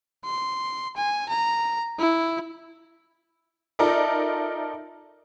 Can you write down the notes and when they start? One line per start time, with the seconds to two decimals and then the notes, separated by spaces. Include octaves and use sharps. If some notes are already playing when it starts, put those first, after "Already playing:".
0.25 C6
0.97 G#5
1.29 A#5
1.99 E4
3.79 D#4 F4 A4 A#4 D5 E5